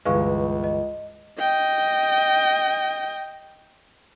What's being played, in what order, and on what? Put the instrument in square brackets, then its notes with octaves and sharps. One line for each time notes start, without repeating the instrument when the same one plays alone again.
[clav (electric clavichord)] G1 E3 G#3 [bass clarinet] C#2 [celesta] B4 F5 C#6
[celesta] D#5
[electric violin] D#5 G5